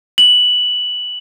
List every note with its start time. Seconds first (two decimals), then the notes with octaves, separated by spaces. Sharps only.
0.18 F#7